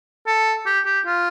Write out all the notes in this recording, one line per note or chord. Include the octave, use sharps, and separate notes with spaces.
A4
G4
G4
F4